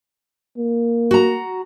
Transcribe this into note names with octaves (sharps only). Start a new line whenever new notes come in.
A#3
F#4 A#5